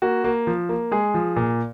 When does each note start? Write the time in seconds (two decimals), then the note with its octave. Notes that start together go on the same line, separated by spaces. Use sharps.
0.02 A#3 F#4
0.24 A#3
0.47 F3
0.69 A#3
0.91 G#3 G#4
1.14 F3
1.36 A#2